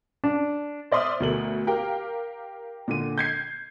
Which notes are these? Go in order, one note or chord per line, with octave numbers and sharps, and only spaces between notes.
D4
C5 D5 E5 C6 D#6 F6
D2 B2 A3 A#4 F#7
G4 A#4 F5 G5
A#2 D3 D#7
G6 G#6 C7